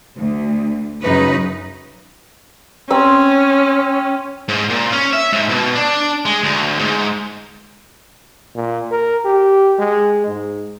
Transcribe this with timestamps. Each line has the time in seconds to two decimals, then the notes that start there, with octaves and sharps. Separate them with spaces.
0.16 D2
1.02 F#2 C#3 D#4 B4
2.91 C4 C#4 E6
4.48 G#2
4.70 A#2
4.92 C#4
5.13 E5
5.33 G#2
5.49 B2
5.75 D4
6.25 G#3
6.43 D2
6.79 G#2
8.55 A#2
8.91 A#4
9.25 G4
9.79 G#3
10.27 G#2